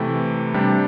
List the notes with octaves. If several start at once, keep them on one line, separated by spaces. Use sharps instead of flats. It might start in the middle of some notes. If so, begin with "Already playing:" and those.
Already playing: C3 E3 A3 E4 G4
C3 G3 D4 G4